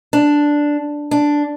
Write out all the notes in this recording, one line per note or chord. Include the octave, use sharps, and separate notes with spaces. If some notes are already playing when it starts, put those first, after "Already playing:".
D4
D4